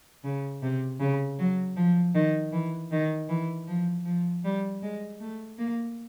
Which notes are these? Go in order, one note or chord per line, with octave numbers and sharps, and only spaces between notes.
C#3
C3
C#3
F#3
F3
D#3
E3
D#3
E3
F3
F3
G3
G#3
A3
A#3